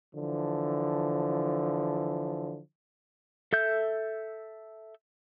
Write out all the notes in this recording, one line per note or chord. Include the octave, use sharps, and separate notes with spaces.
D3 E3 F3
A4 E5 G6